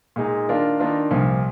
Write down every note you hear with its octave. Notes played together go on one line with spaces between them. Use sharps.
A#2 G#3 D#4 G#4
D#3 A#3 D4 F4 A#4
D#3 A#3 D4 F4 A#4
C2 A#2 F3